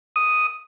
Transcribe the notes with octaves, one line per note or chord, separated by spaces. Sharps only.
D#6